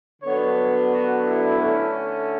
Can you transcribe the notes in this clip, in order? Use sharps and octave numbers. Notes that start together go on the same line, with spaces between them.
D3 F#3 B3 D4 C#5
F#4
E4
D3 A3 C#4